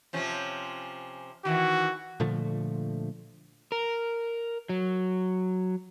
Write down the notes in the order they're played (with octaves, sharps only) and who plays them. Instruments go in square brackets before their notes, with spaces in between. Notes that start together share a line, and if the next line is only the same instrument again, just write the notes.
[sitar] C3 F3 C#4
[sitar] D#3 E3 [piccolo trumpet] F#4
[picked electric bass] A#2 D3 F3 A3
[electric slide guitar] A#4
F#3